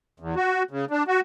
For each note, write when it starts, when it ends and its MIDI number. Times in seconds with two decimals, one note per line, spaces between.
0.20 0.35 40
0.36 0.63 66
0.71 0.85 49
0.91 1.03 62
1.08 1.20 66